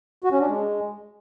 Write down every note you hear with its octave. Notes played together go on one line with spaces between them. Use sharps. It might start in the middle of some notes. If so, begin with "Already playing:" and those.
F#4
C#4
D4
G#3